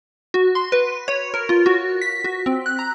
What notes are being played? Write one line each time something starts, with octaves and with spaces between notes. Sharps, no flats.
F#4
C6
B4
C#5
A#4
F4
F#4
B6
F#4
C4
F#6
A#5